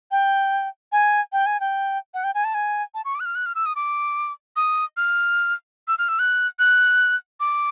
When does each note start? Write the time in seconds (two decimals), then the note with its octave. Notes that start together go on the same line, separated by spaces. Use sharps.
0.11 G5
0.92 G#5
1.32 G5
1.46 G#5
1.60 G5
2.14 F#5
2.24 G5
2.35 G#5
2.44 A5
2.54 G#5
2.94 A5
3.05 C#6
3.15 D6
3.20 F#6
3.25 F6
3.35 F#6
3.46 F6
3.55 E6
3.66 D#6
3.76 D6
4.56 D#6
4.97 F6
5.88 E6
5.99 F6
6.09 E6
6.19 F#6
6.59 F#6
7.40 D6